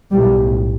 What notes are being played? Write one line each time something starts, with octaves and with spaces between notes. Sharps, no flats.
B1 A2 G3